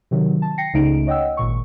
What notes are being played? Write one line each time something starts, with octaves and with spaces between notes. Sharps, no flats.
C3 D#3 F#3
A5
G5 A#6 C7 C#7
C#2 C#3 A3 D#4 D7
C#5 D#5 F#5 G5 E6
G#1 A#2 C#6